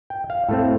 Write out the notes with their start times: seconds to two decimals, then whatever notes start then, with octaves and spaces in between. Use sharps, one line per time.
0.10 G5
0.30 F5
0.49 A2 A3 C4 A4